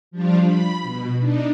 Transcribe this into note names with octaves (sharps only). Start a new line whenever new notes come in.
F3 G3 D4 F4
B5
B2
D4 D#4